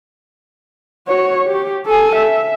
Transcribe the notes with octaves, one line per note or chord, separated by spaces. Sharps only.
F#4 C#5
G4
A4 G#5
E5